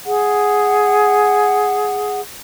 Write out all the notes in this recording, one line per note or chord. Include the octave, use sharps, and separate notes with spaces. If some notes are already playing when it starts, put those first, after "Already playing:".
G#4 F#5